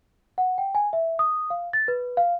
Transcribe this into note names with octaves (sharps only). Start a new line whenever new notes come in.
F#5
G5
G#5
E5
D#6
F5
A6
B4
F5